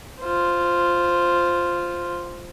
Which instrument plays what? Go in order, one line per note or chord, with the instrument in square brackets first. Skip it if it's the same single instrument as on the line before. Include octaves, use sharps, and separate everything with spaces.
[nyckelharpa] F4 C5